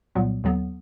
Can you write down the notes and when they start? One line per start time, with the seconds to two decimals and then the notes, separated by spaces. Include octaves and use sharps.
0.15 C2 A#2 F#3 B3
0.44 D#2 D3 F#3 B3